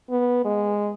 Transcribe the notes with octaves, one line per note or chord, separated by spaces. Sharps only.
B3
G#3